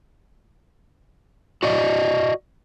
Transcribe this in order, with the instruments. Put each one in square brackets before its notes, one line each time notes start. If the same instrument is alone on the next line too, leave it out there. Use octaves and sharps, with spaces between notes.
[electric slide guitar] F#4 D5 D#5